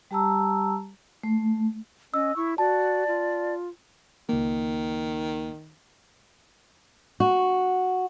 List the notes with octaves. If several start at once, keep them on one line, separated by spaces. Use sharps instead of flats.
G3 G4 A5 A#5 E6
A3
C#4 D#5 E6
E4 C#6
F#4 D5 A5
F4
C#2 D#3 A#3
F#4